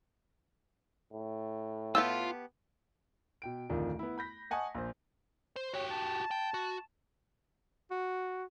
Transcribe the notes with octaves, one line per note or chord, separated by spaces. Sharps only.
A2
B3 F4 G4 A5 E6
B2 G5 D7
D1 F2 D3 D#3 F3
B3 E4
B5 G6 A#6 B6
D#5 F#5 G#5 A5 C#6 D#6
A#1 C5
C5
F#4 G4 C#5
A5
G5
F#4
F#4